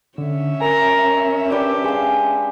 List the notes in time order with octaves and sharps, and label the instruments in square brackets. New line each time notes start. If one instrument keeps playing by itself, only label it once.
[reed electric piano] D3 [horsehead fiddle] C#4 E5
[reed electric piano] A#4 G#5 [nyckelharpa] A#5
[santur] D4 B4 [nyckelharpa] G4
[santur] G#3 F5